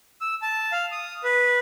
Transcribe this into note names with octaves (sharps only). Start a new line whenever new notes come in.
E6
A5
F5
D#6
B4